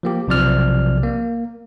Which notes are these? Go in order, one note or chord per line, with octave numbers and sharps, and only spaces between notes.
F3 A#3 G4
B1 C3 F3 D5 F6
A#3